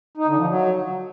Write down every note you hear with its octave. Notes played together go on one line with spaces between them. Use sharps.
D#4
D3
F3
F#3